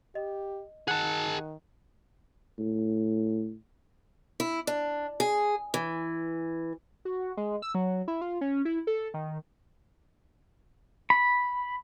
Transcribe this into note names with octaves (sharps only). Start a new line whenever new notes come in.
G4 D#5
D#3 G#4 F#5 A5 F#6 C#7
A2
E4
D4
G#4
E3
F#4
G#3
E6
F#3
E4
F4
C#4
E4
A4
D#3
B5